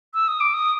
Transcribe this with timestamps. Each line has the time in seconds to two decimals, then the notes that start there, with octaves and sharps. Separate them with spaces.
0.14 E6
0.28 D#6
0.40 D6
0.54 D#6